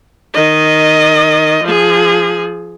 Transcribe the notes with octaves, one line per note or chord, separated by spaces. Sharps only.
D#3 D#5
F3 G#4